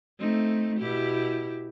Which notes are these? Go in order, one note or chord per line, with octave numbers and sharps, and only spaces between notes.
A3 C4 D#4
B2 E4 G4